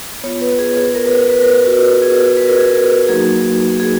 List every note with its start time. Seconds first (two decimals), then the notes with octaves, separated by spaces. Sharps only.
0.24 B3 F4 C#5
0.41 B4
0.59 G#4
0.77 G#4
0.95 A#4
1.06 B4
1.18 A#4
1.30 B4
1.41 A#4
1.66 F#4
2.02 G#4
2.37 B4
2.48 A#4
2.57 G#4
2.68 A#4
3.09 F#3 A#3 D#4 F#4 G#4
3.80 G#4